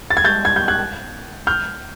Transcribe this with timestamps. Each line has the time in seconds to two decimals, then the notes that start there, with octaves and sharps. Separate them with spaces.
0.10 A6
0.17 G#6
0.24 G6 A6
0.45 G#6
0.56 G6
0.68 F#6 G#6
1.47 F6 G6